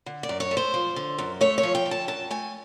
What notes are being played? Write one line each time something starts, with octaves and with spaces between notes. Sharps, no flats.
D3
D5
F#2
C#5
A3
C5
F3
D3
F#2
A3 C#5
C#5
F3
G5
D3
A5
F#2 A5
A3 G#5